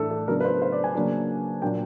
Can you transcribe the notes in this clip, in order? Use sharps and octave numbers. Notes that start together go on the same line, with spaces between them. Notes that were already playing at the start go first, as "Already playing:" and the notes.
Already playing: A2 E3 A3 D4 A4
A4
C#3 F#3 B3 D4 A#4
B4
C5
C5
D5
G#5
C#3 F#3 A#3 D4
A#2 F#3 A#3 D4 G5